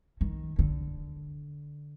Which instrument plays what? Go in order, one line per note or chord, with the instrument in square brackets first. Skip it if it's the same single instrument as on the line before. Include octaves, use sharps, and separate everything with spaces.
[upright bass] D#3
D3